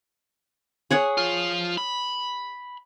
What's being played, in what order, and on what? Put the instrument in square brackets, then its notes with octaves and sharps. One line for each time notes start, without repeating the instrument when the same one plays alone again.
[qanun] G#4 C#5 F#5
[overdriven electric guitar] F3 F4
B5